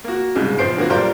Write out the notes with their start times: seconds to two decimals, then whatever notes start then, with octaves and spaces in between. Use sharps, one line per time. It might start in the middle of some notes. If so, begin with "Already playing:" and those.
0.04 A#3 F#4
0.35 C2 G#2 C#3
0.58 A#1 F3 B3 C5 C7 D7
0.77 D3 F#3 A#3 B3 F#4
0.89 A#1 G3 F4 A#4 C5 D5